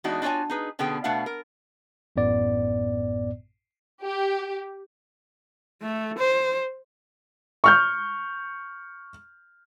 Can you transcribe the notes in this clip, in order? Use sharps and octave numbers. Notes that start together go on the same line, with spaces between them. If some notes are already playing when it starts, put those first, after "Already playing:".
E3 G#3 B3 D4 D#4 F#4
D4 F4 F#4 C#5 G#5
D#4 G#4 B4
B2 D3 B3 C#4 G#4 G5
B2 A3 B3 D4 F5 F#5
A#4
A1 F#2 A2 B3 D5
G4
A3
C5
C#6 F6 G6